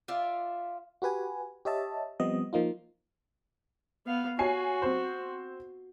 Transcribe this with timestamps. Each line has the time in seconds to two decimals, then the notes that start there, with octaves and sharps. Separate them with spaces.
0.08 F4 D5 E5 F5
1.02 F#4 G4 B4 G#5
1.65 G4 C#5 D#5 E5 A5
2.20 F3 G3 B3 C4 D#5
2.53 F3 A#3 D#4 F4
4.06 B3 F5
4.39 F#4 C#5 G#5 C7
4.82 C4 C5